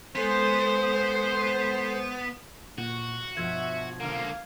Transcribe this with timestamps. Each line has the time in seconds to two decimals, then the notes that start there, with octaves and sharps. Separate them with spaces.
0.15 G#3 B3 A4 C5 G#5
2.78 A#2 F#4
3.37 G2 B2 F3 E5 G#6
4.00 D3 A#3 F5